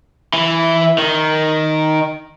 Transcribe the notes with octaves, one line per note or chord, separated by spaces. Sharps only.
E3
D#3